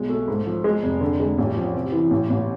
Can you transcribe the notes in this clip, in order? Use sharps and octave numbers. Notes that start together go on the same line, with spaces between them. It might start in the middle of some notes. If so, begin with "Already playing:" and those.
Already playing: B1 G#3
A3
G#2
F3
G#3
F1
D3
G#3
A1
F3
C3
E3
A1
A1